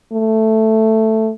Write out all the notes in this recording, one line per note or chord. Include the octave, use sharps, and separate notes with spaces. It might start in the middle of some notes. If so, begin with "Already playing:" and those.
A3